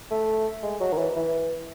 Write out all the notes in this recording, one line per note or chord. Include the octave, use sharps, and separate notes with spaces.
A3
G#3
F#3
D#3
E3
E3